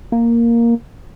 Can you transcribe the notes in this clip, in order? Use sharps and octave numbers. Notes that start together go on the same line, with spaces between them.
A#3